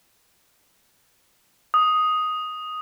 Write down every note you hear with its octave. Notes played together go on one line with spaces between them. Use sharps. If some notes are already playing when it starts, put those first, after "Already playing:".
D#6